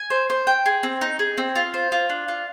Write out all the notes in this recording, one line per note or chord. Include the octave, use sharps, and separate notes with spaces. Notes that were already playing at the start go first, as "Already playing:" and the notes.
Already playing: G#5
C5
C5
G5
G#4
C4
D#4
G#4
C4
F4
C5
F4
D4
F4